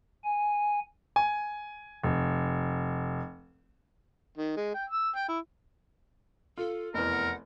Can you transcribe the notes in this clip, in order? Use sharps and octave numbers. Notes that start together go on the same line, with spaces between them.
G#5
G#5
F1
D#3
G#3
G5
E6
G5
E4
F4 A4
F1 E2 A#4 D#5
F#5